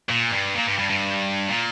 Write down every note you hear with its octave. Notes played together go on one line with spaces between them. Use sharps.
A#2
G2
A#2
G2
G2
G2
A#2